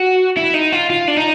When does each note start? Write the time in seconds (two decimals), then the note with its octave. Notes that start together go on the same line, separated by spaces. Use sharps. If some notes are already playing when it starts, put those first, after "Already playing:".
Already playing: F#4
0.37 E4
0.54 D#4
0.72 F4
0.90 F4
1.08 D4
1.17 D#4